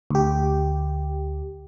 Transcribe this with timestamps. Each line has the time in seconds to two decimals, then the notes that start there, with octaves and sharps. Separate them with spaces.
0.11 D2 G4